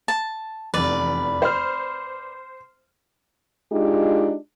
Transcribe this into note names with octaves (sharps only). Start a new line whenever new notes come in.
A5
F1 E2 B4 D5
C5 F6
G#3 D4 D#4 F4 G4